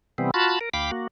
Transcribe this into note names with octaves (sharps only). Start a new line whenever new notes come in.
C3 E3 G3 B3 C4
F4 F#4 A5 B5
A#4
D2 F5 G5 B5 D6
A#3 F#4